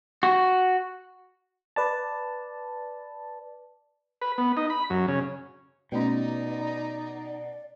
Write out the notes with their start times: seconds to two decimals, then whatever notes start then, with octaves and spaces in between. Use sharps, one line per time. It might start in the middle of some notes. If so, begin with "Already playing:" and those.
0.23 F#4
1.76 B4 D5 A5
4.22 B4
4.38 B3
4.57 D#4
4.70 B5
4.90 F#2
5.08 C#3
5.92 B2 A3 C#4 D#4 D5